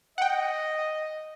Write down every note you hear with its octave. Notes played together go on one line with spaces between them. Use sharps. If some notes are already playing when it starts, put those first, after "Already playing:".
D#5 F#5 G5